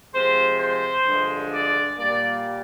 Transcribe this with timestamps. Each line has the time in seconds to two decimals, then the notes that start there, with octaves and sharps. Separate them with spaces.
0.14 C3 F3 G#3 C5
0.60 C5
1.06 G2 D3 F3 G#3
1.52 D5
1.98 A#2 G3 A#3 D5